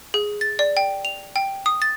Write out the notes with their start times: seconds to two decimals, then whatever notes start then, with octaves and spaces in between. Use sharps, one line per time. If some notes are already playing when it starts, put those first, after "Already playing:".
0.14 G#4
0.41 A6
0.59 D5
0.77 G5
1.05 F7
1.36 G5
1.66 D#6
1.82 A6